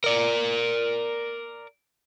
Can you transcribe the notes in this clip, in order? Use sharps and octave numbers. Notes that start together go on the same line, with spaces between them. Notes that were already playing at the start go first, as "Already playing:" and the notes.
A#4 D5